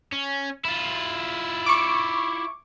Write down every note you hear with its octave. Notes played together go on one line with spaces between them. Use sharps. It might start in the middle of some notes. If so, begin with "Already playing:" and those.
C#4
E4 F4
C#6 D6